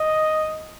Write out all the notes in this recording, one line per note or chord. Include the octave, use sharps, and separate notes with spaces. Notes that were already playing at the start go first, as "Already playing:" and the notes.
Already playing: D#5